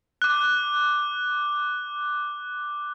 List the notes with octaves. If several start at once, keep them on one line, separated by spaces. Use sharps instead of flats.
D6 F#6